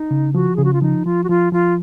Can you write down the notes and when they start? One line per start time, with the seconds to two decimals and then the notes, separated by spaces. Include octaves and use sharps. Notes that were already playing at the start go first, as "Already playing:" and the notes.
Already playing: D#4
0.11 C#3
0.35 F3 F#4
0.56 C#3 G#4
0.64 F#4
0.73 F4
0.82 F3 D#4
1.05 F3 F4
1.24 F#4
1.29 F3 F4
1.52 F3 F4